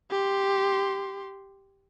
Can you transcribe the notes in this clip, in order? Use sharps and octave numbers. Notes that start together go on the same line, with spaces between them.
G4 C6